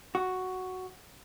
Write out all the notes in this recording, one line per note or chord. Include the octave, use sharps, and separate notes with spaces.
F#4